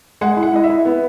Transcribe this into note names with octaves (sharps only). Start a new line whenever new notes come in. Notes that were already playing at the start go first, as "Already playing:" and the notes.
G#3 F#5
E4
F#5
E4 D#5
E5
E4
B3